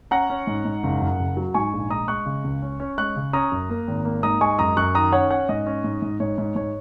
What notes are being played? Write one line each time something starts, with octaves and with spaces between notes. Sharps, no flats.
C#4 F#5 A#5
C#4
G#2
G#2
F#1
F#2
F#1
F#3
G#2 G#5 C#6
A#1
G#3 A#5 D#6
G#3 C#6 F#6
C#3
C#2
C#4
C#4
G#3 C#6 F#6
C#3
C#4 A#5 D#6
F#2
A#3
G#1
A#3
G#2 A#5 D#6
G#3 G#5 C#6
F#2 A#5 D#6
F#2 C#6 F#6
D#3 A#5 D#6
C#4 C#5 F#5
C#4 C#5 F#5
G#2 D#5
C#4
G#2
G#2
G#2 C#5
G#2
G#2 C#5